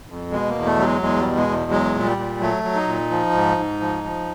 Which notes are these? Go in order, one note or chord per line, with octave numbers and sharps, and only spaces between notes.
F2
B2 G#3
A#3
E2
A3
F#3 G3
G#3
E2 G#3
B2 G3
G#3
E2
F#3 G#3
A#2
G3
A#2
F#3 A3
F#3
D#4
A#2
F3
G#2
G#2
F3
F3